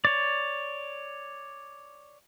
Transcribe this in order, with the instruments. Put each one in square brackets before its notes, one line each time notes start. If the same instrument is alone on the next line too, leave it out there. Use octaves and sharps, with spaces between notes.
[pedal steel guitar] C#5 D5